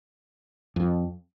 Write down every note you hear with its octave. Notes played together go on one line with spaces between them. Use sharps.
F2